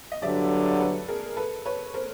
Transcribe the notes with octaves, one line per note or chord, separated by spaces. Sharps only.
D#5
G2 D3 F#3 D5 E5
A4 B4
G#4 A#4
A4 B4
B4 C#5
A#4 C5